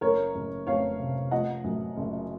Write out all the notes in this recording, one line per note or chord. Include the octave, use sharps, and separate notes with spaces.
F#1 A#4 C#5
F#1
F2 C#5 F5
C3
F3 D#5 F#5
F#2
F#1